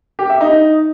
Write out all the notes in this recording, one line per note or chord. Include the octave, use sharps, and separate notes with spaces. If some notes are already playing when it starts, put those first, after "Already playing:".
G4
E5
D#4